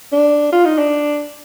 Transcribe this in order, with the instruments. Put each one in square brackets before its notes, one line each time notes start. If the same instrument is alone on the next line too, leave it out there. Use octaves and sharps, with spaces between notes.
[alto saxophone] D4
F4
D#4
D4